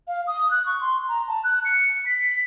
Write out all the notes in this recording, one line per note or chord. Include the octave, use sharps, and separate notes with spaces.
F5
D#6
F#6
C#6
C6
A#5
A5
F#6
C#7
B6